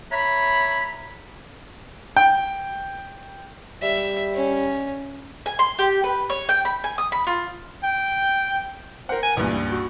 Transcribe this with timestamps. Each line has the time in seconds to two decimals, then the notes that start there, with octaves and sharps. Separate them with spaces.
0.12 C#5 E5 A#5 B5
2.16 G5
3.82 G3 E5
4.34 C#4
5.46 G#5
5.59 C6
5.79 G4
6.04 B4
6.30 C#5
6.49 G5
6.65 B5
6.84 G#5
6.98 D#6
7.12 B5
7.27 F4
7.84 G5
9.09 A#4 C5 F#5
9.23 G#5
9.37 C#2 G2 A#2 E3
9.71 F#4